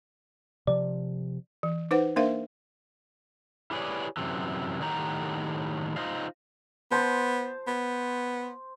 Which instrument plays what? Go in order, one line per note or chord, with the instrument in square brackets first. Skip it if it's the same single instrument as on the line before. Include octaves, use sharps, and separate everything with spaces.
[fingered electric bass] C3 F3 [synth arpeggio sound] D5
[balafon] E3
D#4 B4 C5 F#5
A#3 D4 A#4 C5 E5 F5
[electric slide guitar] E4 G4 G#4 B4 C#5 D5
F#2 C3 E3
A2 D#3 F#3 F#4 G4 A#5
D#4 F4 C5 D#5 F5
[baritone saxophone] B3 [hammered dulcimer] C5 A5
[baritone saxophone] B3